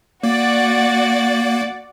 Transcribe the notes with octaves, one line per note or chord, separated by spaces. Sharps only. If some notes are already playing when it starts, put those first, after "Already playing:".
A#3 F#4 D5 F#5